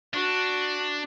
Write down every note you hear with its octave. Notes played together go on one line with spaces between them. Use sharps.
D4 F#4